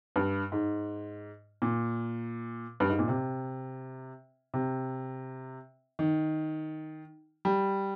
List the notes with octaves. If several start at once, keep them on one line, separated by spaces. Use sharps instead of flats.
G2
G#2
A#2
G2
G#2
A#2
C3
C3
D#3
G3